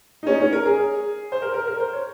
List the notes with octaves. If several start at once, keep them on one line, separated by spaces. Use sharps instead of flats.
D#4
C#4
C#4
A#4
G#4
C5
A#4
A#4
A#4
C5
C#5